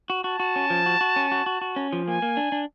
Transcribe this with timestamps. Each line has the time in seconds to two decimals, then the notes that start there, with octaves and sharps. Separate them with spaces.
0.10 F#4
0.24 F#4 A5
0.40 F#4
0.56 C#4
0.70 F3
0.86 F#4
1.01 F#4
1.16 C#4
1.32 F#4
1.46 F#4
1.61 F#4
1.76 C#4
1.93 F3
2.07 A#3 G#5
2.22 A#3
2.37 D4
2.52 D4